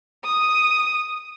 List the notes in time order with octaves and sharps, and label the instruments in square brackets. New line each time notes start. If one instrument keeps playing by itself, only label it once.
[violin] D#6